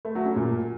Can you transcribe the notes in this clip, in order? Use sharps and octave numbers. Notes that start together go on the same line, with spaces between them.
A3
F#3
C#4
A#2